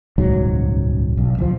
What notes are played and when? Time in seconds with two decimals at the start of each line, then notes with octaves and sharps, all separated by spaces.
0.18 D#1 C#2 G#2 F#3
1.17 B1
1.38 D1 F3